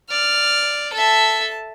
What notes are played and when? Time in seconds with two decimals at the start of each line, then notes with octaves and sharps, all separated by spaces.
0.10 D5 F6
0.93 A4 E5 A5